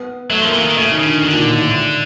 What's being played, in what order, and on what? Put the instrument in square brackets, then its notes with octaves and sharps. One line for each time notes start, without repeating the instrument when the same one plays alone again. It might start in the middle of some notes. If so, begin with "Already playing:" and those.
Already playing: [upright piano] B3
[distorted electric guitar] F#3 [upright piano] A3
[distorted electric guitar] F3 [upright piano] A#3
[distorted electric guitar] E3
[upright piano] A#3
[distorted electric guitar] D#3
[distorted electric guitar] C#3 [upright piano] A3
[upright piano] D#3
[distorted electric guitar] C#3
[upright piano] D3
[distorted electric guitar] D3 [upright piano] D#3
[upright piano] A#2
A#2
A2
G#2